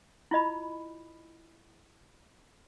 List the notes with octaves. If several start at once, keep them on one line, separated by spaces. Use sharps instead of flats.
E4 F4 D#5 B5